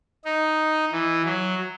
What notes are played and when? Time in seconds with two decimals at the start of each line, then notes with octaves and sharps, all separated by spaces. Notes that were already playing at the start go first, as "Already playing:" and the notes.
0.25 D#4
0.92 E3
1.25 F#3